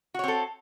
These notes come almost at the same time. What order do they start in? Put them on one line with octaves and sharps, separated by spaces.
F#4 C#5 C4 A4